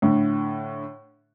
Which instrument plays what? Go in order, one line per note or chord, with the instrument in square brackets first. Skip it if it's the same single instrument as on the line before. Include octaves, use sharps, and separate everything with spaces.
[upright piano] A2 D3